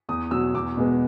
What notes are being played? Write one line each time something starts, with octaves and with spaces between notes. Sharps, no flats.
E2 D#6
B2 F#3 E6
E2 D6
B2 G#3 B3